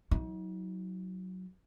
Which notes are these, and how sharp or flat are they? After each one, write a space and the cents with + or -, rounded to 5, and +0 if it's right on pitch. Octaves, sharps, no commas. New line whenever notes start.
F#3 +0 D#4 +40